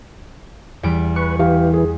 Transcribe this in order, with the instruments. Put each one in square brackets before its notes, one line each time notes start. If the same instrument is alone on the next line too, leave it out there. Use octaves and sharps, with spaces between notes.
[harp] E2 G3 D7
[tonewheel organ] B4 [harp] C#6
[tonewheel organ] E3 [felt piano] G4 F5
[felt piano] G#4